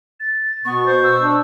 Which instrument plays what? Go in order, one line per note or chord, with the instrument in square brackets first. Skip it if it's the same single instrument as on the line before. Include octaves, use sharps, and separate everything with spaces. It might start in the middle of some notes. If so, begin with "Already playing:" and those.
[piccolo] A6
[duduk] B2 [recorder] B3 [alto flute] C#6
[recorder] C5
[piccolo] E6
[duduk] D4